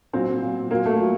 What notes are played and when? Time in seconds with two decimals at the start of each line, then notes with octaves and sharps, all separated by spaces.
0.13 A#2 F#3 C4
0.42 A#2 F#3
0.71 A#2 F#3 A#3
0.86 A3
1.00 A#2 F#3